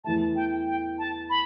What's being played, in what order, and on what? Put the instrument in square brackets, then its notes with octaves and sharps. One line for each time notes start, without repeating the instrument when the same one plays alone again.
[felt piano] E2 E3 A3 [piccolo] A5
[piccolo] G5
G5
A5
B5